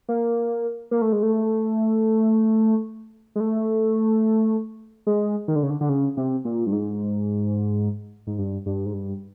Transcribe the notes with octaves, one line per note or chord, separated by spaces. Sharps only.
A#3
A#3
A3
G#3
A3
G#3
A3
G#3
D#3
D3
C#3
D3
D3
C#3
C3
A#2
G2
G#2
G#2
G2
G2
G#2
G2